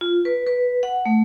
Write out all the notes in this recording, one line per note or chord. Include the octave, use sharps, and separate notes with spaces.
F4
B4
B4
F#5
A3